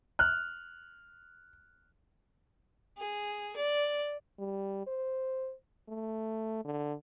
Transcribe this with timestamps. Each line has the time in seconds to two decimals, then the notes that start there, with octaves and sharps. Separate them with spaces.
0.19 F6 F#6
2.98 G#4
3.56 D5
4.39 G3
4.87 C5
5.88 A3
6.65 D3